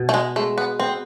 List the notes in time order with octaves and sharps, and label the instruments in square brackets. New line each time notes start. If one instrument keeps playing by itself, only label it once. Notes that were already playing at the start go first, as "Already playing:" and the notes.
Already playing: [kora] B2
[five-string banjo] A3
G#3
[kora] G#3 [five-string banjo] A3
[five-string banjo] B3
[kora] B3 [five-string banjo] C4